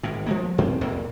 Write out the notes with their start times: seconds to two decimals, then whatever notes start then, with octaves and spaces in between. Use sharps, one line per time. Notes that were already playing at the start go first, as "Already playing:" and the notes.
0.03 G#1 A2
0.26 F3 G#3 A#3
0.58 G2 C4
0.81 B1 E2 A#2 A#3